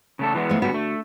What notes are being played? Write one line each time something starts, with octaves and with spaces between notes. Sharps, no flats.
C#3 A3 A4
E3 G#3 B3
F3 A3
G#2 D3 G3 B3 F#4
A3